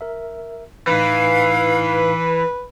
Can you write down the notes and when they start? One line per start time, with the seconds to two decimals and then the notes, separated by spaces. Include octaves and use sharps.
0.01 A#4 E5
0.87 A2 E3 D#4 E4 B4 F5